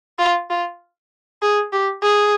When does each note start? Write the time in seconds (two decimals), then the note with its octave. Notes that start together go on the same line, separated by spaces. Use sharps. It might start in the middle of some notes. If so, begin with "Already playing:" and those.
0.19 F4
0.50 F4
1.42 G#4
1.72 G4
2.03 G#4